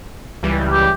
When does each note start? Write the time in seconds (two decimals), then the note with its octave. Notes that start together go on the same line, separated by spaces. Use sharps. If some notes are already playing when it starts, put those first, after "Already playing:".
0.43 C#2 E3 G3
0.72 G4